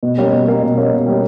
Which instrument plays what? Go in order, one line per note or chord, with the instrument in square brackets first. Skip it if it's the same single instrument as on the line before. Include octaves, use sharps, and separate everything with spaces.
[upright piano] B2
G3 A#3 C#4
B2
G3 A#3 C#4
B2
G3 A#3 C#4
B2
G3 A#3 C#4